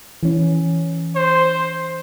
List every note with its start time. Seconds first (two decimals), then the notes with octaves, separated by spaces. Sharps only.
0.23 E3 C#4
1.16 C5